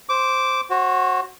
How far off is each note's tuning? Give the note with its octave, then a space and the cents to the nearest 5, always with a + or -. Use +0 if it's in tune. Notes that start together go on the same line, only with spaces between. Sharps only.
C5 +0 D6 -10
F#4 +0 C5 +35